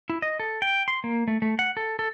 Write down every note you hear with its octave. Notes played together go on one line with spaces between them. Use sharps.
E4
D#5
A4
G5
C6
A#3
A3
A3
F#5
A4
A4